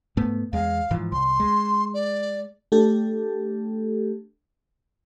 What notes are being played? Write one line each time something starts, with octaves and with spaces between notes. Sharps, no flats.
G#2 A3 B3
E2 G#3 F5
G#2 E3 F3
C2 C6
G#3
D5
A3 D4 G4 A4